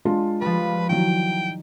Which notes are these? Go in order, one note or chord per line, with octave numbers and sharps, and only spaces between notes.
G#3 D4 F4
F3 G3 B4
D#3 E3 F#3 G5